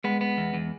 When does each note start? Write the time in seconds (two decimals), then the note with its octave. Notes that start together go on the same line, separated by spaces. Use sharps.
0.04 G#3 B3
0.21 B3
0.37 E2
0.54 E2